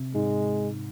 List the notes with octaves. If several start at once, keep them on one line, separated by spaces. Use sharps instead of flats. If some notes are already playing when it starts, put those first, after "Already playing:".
Already playing: C3
G#2 G#3